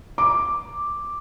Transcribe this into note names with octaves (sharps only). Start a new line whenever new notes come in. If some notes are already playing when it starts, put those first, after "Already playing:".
D6